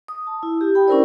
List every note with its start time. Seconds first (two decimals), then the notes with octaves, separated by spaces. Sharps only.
0.08 D#6
0.27 A5
0.43 E4
0.61 G4
0.75 G5 B5
0.88 C#4 D4 E4 A#4 C5 D5